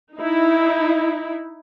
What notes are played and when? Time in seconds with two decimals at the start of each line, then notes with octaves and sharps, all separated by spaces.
0.15 D#4 E4